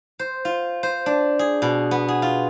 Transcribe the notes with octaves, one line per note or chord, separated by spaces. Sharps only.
C5
F4
C5
D4
G#4
B2
B3
G#4
F4